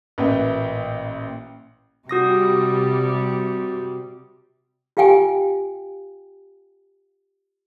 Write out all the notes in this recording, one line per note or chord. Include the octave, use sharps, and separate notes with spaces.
A1 A#2 B4 E5 G5
C3 G3 F#4 D#6 A#6
F4 G4 F5 G5 G#5